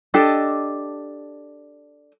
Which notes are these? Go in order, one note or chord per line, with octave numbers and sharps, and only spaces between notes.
D4 G4 A4 D#5